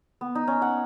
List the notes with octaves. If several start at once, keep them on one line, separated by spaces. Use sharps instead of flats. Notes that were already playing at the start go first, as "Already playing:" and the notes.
B3
D#4
C#4
F#5